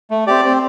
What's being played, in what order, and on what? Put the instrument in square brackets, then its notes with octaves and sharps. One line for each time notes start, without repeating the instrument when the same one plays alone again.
[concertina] A3
C4 G4 D5
C4